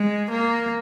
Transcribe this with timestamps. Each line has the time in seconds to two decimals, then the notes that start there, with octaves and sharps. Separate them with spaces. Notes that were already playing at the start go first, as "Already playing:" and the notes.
Already playing: G#3
0.31 A#3